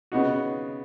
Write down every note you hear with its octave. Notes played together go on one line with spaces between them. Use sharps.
C#3 B3 D#4 F#4